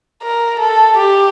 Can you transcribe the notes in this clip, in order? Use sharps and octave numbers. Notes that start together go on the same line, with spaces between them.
A#4
A4
G4